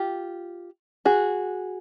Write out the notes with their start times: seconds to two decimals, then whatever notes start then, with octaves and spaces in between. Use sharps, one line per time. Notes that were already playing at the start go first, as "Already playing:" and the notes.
Already playing: F4 G4
1.05 F#4 G#4